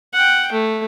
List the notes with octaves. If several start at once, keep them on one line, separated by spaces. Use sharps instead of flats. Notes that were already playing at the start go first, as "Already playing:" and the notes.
F#5 G5
A3